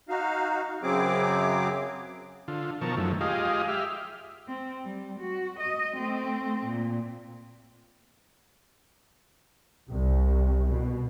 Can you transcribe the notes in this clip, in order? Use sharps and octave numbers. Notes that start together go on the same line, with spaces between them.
D#4 F#4 F5
F#2 C#3 F#3 C4 G#4 D6
D3 F4
B2 D#3 F3 A#4 A5 C#6
F#2 D#3 F3 F#3 A3
G#3 F4 G4 G#4 D#5 F5
G4 E5 F6
C4
G3
F#4
D#5
A3 C4
A#2
C2
B2